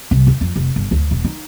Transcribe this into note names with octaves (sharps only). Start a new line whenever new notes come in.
C2
D#2
F2
F1
G1
D2
E1
D#4